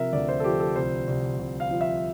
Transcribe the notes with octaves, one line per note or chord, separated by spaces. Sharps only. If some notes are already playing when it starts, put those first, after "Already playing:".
Already playing: C3 F3 A#4 E5
D2 D5
C5
A4
F3 G4
A4
C2 C5
C2
C2
F5
F3
E5